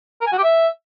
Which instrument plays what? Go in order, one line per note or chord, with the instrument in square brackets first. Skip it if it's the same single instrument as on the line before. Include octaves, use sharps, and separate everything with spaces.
[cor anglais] A#4
G#5
F#4
G4
E5